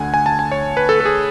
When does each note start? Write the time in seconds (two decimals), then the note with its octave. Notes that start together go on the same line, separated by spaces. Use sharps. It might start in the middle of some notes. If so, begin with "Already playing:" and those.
Already playing: D2 D3 F#5 G#5
0.14 G#5
0.26 A5
0.39 G#5
0.52 C#5
0.77 B4
0.89 A4
1.00 A4
1.05 G#4